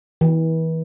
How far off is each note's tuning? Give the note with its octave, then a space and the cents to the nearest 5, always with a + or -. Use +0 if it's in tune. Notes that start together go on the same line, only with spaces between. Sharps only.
E3 -30